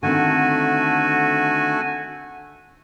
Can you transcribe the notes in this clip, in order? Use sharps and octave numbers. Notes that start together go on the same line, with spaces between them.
D3 D#3 A3 C4 F#4 G#5